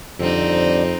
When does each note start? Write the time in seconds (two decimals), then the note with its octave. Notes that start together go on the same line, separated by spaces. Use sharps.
0.19 F2 D3 G3 C4 D4 D#4